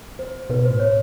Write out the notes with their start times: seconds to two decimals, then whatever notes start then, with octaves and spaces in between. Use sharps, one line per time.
0.19 C5
0.50 B2 B4
0.65 C5
0.71 A2
0.80 C#5